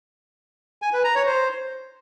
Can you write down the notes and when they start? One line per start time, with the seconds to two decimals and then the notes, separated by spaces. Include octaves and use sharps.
0.82 G#5
0.93 B4
1.04 A#5
1.15 C#5
1.26 C5